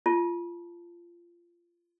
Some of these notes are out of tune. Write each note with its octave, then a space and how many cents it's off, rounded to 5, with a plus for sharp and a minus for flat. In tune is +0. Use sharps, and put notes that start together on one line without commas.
F4 -20 A5 +0